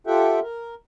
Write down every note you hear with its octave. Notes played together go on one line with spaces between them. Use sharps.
F4 G4 A4 E5 F#5 G5
A#4